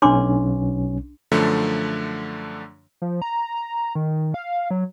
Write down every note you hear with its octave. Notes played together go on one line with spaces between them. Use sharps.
B1 C#4 D4 C6 D6
F#2 D3 F3 A3
F3
A#5
D#3
F5
F#3